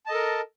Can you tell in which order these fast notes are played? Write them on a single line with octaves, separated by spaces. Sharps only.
A5 D#5 A4 A#4